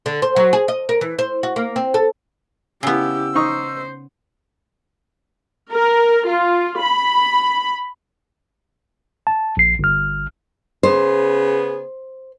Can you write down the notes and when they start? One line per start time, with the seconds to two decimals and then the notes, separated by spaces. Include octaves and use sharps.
0.06 D3
0.22 C5
0.36 F#3
0.53 G#4
0.68 D#5
0.89 A#4
1.01 E3
1.19 C5
1.43 F#4
1.56 A#3
1.76 C4
1.94 A4
2.83 C#3 B3 E4 G4 E6
3.35 D#4 C5 C#6 D#6
5.72 A#4
6.27 F4
6.81 B5
9.27 A5
9.57 A#1 C7
9.79 G1 F6
10.83 C#3 B3 G#4 C5